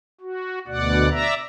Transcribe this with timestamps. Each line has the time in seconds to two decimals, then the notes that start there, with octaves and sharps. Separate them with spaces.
0.21 F#4
0.67 D2 B2 D5 F#5
1.11 D5 E5 A#5